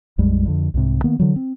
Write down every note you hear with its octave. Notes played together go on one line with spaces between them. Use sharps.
A#1 F2 G3 G#3
F2 D3
C2 G#2 C3
D#3 A#3 B3
D3 E3 F#3
C4